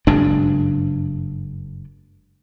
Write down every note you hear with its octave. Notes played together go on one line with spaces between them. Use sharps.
F#1 G2 G#3 D4